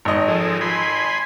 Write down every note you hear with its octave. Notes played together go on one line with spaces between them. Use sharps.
G#1 D#5
F3 G#4 A4
G#5 B5 C6